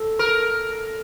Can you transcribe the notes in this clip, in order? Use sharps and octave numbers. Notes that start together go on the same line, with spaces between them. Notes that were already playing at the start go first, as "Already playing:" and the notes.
Already playing: A4
A#4